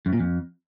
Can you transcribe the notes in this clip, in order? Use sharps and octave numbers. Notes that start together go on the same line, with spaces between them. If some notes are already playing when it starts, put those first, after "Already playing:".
F#2
A#2
F2